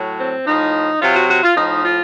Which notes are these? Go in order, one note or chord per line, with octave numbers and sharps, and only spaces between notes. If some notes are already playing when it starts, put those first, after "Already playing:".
Already playing: A2 F#3
C4
A2 F3 D#4
C3 F#3 F4
F#4
F#4
F4
A2 F3 D#4
F4